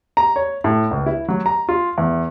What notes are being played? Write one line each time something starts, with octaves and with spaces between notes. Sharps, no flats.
A#5
C#5
A2
C#2
E4
F#3
A#5
F4
E2